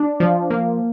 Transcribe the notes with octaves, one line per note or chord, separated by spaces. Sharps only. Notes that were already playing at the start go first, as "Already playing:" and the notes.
Already playing: D4
F3
A#3